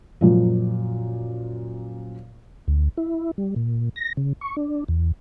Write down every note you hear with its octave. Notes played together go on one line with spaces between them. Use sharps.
F#2 A#2 F3
D2
E4
G3
A#2
A#6
C#3
C#6
D4
E2